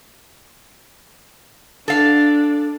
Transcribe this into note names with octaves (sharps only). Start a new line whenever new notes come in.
D4 A4 F5